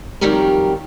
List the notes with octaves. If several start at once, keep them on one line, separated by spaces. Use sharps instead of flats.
F2 D#3 F#3 G3 G4 A#4